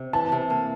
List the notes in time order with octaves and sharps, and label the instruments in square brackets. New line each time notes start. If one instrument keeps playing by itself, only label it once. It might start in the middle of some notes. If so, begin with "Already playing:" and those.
Already playing: [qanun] C3
[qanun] E3 [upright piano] A5
[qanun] C3
A#3